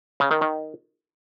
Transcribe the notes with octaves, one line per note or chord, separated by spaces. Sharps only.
C#3
D#3
D#3